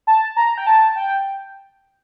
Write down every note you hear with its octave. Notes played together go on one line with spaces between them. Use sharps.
A5
A#5
G5
A5
G5